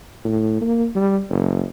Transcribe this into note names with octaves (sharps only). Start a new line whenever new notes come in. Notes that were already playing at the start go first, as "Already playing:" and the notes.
A2
A#3
G3
F#1